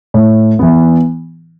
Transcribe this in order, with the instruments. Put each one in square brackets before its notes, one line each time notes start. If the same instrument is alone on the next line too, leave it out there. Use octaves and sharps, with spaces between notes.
[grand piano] A2
E3 B3